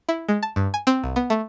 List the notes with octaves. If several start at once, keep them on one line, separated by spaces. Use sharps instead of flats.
E4
G#3
A5
G2
G#5
C4
C2
B3
A3